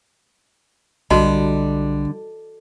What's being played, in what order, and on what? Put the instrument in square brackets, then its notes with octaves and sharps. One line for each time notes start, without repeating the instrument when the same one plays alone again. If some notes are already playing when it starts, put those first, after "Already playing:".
[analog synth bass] B1 [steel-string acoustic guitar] D3 [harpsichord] G3 [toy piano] F#4 D#5 A5